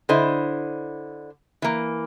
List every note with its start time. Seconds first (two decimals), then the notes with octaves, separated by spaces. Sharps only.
0.09 D3 E4 C5 D#5
1.62 E3 A#3